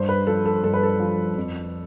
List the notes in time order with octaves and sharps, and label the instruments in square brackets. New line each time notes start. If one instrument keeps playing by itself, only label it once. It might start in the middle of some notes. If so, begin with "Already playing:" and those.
Already playing: [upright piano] G2 C5
B4
F3 A4
A4
G2 A4
B4
A4
F3
F2